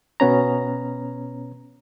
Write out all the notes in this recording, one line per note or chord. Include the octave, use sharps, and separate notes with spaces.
B2 B3 C#4 A#5